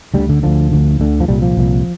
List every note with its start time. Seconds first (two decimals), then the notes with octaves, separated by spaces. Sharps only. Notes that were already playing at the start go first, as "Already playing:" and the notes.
0.14 D2 D3 G3
0.29 D3
0.43 D2 D3 F3
0.71 D2 D3
1.00 D2 D3
1.20 F3
1.28 C2 A#2 G3
1.42 F3
1.57 C2 A#2